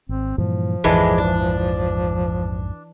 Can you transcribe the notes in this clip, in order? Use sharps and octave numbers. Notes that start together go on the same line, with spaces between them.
G#1 C4
G2 A#2 E3 F3
A#1 F2 G#2 E3 G#3 D4 A4
D4